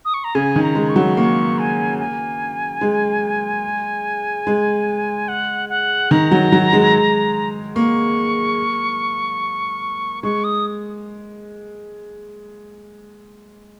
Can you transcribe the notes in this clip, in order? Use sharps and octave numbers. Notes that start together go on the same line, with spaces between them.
D#6
C#6
A#5
C#3 G#5
D#3
A#5
G#3
C#6
F#3
A#3 C#6
G#5
G#5
G#3
G#3
F#5
F#5
D#3 A#5
F#3
F#3
G#3
A#3 C#6
G#3 C#6
D#6